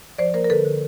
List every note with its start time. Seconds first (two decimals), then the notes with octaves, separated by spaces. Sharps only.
0.18 F3 C5 D5
0.34 A#3 A#4 C5
0.44 A#4
0.50 D3 A4 B4
0.65 D3